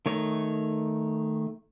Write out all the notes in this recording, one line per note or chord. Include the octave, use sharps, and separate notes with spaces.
D#3 A3 C#5